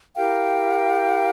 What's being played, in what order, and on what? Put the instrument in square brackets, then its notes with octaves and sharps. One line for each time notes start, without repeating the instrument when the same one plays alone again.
[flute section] E4 G4 A#4 F5 G5